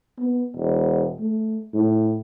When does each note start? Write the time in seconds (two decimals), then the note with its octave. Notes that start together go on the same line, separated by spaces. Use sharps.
0.19 B3
0.56 E1
1.20 A3
1.74 A2